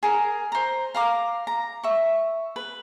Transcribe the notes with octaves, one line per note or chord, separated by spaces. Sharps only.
G#4 A#4
C5 A#5
F5 A#5 D6
A#5
E5 C#6
B4